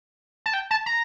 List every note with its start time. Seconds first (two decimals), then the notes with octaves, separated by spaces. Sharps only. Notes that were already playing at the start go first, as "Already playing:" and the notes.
0.46 A5
0.54 G5
0.71 A5
0.86 A#5